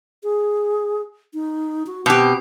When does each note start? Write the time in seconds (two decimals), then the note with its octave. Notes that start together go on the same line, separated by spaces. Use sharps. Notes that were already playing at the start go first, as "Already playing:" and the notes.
0.23 G#4
1.34 D#4
1.87 F#4
2.06 B2 C4 G4